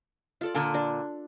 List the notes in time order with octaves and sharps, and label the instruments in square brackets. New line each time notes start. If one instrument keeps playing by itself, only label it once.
[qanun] F4 A4 D5
[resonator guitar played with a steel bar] A#2 D3
[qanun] D4 A4